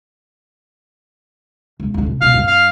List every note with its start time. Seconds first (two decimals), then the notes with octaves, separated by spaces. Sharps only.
1.80 E1
1.94 D1 F2
2.06 C3
2.22 B2 F5
2.34 F#2
2.47 F5